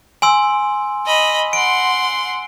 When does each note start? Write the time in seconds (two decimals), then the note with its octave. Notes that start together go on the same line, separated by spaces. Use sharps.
0.22 G#5 C6 E6
1.06 D#5 B5
1.53 F#5 C6 D7